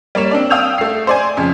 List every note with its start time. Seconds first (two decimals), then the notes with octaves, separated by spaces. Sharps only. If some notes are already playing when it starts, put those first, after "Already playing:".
0.15 G3 A#3 C#5 E7
0.31 C4 D4 D5
0.50 F5 G5 D#6 E6 G6 F7
0.78 A3 C7
1.07 C5 D5 G#5
1.37 F2 C#3